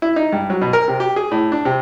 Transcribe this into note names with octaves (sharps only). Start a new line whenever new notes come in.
E4
D#4
G2
F#3
B2
A#4
C3
G4
G#4
A2
D4
C3